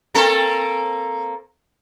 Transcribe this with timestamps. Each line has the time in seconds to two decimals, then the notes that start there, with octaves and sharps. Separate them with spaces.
0.15 A#3 C4 A4